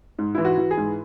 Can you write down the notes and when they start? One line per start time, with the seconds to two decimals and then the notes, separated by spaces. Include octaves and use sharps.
0.19 G#2
0.35 E3 E4
0.45 F#4
0.58 E3
0.71 G#4
0.77 G#2